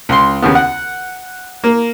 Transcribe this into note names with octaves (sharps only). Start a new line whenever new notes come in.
C#2 C6
D#2 C#3 B3
F#5
A#3